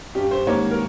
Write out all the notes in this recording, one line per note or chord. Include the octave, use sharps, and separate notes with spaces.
G2 G3 C#4 G4
C5
G#2 D#3 G3 A#3 C#4 C#5
A#4